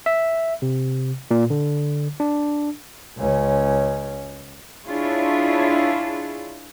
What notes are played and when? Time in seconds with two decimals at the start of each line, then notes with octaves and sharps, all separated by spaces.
0.06 E5
0.62 C3
1.31 A#2
1.50 D3
2.20 D4
3.17 C#2 C#4
4.87 D4 E4 F4 G#4 C#5